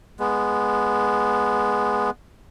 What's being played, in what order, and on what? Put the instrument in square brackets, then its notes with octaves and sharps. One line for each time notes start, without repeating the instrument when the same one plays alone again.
[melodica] G#3 B3